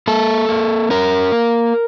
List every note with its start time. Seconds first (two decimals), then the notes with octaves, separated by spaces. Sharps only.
0.08 A#3 A4
0.49 A#3
0.90 C#4 A#4
1.32 A#3